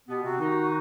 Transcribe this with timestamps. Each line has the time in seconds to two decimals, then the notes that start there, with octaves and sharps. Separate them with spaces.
0.08 B2 B3 G4
0.23 C3 C4 F#4
0.39 D#3 D#4